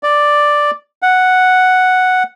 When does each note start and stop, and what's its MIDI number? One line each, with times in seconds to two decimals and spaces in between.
0.03 0.71 74
1.02 2.23 78